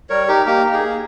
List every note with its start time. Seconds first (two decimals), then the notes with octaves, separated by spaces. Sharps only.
0.10 G3 A#4 C#5
0.28 D#4 G4 A#4
0.46 A#3 G4 A#4
0.65 D#4
0.74 G#4
0.83 A#3